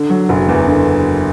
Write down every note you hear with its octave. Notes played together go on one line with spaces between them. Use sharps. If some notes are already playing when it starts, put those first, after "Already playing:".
Already playing: D3
F#3
F#1
E2
D3